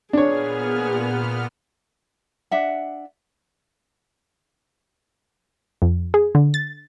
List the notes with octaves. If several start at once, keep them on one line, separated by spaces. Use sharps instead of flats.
A#2 B3 D4 G#4 C#5 F6
D4 E5 F#5
F2
G#4
D3
A6